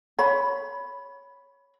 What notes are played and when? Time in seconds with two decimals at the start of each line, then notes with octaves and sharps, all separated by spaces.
0.19 C#5 B5